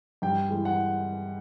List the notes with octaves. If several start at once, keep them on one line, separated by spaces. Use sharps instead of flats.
G2 G5
E3 G#3
F#5